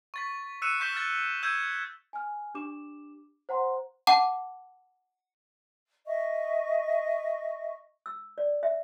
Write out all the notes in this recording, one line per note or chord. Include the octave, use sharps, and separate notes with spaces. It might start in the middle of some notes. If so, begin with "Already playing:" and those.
C#6 A6 B6
E6 F#6 C#7 D#7 E7
C#6 G6 B6 E7 G7
F6 A6
E6 G6 G#6 D#7
G#5 F6
D4 G4 D6 E7
C5 F#5 A#5 C6
F#5 A5 D6
D#5 E5 C#6
E6
D5
E5